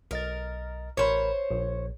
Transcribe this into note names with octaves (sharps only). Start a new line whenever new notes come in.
B1 A#4 D#5 A6
A1 A#4 C5 C#5 B5
A#1